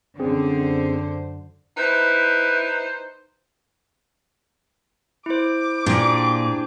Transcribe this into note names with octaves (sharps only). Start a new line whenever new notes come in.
F#2 D3 C4 C#4 G#4 C5
D#4 E4 B4 C5
E4 C5 D6
A#2 D4 G4 G#4